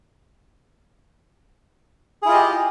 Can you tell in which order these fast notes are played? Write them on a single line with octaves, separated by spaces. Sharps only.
G#4 E4 F4 D#5 G4